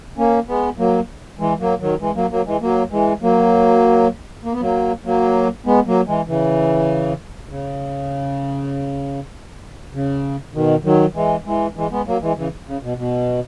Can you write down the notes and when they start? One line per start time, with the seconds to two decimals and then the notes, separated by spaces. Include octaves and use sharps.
0.17 A#3 C#4
0.48 G#3 B3
0.78 F#3 A#3
1.39 E3 G#3
1.59 F#3 A#3
1.80 D#3 F#3
2.00 E3 G#3
2.16 F#3 A#3
2.31 F#3 A#3
2.46 E3 G#3
2.61 F#3 A#3
2.92 E3 G#3
3.22 F#3 A#3
4.44 A#3
4.53 B3
4.61 F#3 A#3
5.05 F#3 A#3
5.66 G#3 B3
5.87 F#3 A#3
6.07 E3 G#3
6.28 C#3 E3
7.49 C#3
9.93 C#3
10.54 B2 D#3
10.84 D#3 F#3
11.15 E3 G#3
11.46 E3 G#3
11.76 E3 G#3
11.91 G#3 B3
12.06 F#3 A#3
12.22 E3 G#3
12.37 C#3 E3
12.67 C#3
12.83 B2
12.97 B2